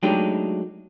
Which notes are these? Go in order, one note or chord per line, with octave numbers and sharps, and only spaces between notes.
F#3 G#3 A3 D4 D#4 G4